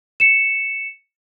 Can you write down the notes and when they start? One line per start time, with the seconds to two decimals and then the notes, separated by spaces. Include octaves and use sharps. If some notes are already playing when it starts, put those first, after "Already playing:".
0.20 C#7 E7